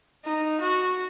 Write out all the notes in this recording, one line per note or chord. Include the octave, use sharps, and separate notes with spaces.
D#4
F#4